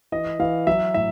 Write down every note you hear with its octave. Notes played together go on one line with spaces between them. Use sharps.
E3 D#5
E3 F5
F#3 E5
A2 E5